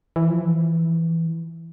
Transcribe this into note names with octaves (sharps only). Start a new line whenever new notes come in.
E3
F3
E3